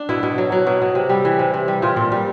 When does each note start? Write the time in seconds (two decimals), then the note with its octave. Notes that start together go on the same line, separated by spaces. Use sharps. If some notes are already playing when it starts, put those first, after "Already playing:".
Already playing: D4
0.09 B2 E4
0.23 B2
0.38 F#3
0.52 F#3
0.67 B2
0.82 B2
0.95 C3
1.09 G3
1.25 E3
1.39 C3
1.54 C3
1.68 G3
1.82 A#2 F4
1.96 A#2
2.12 G3